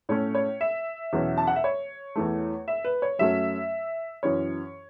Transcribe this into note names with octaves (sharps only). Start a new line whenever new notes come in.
A2 A3 C#4 C#5
C#5
E5
E2 B2 F#3 C#4
A5
F#5
E5
C#5
E2 E3 A3
E5
B4
C#5
F#2 F#3 A3 C#4 E5
F#2 E3 C#4 C#5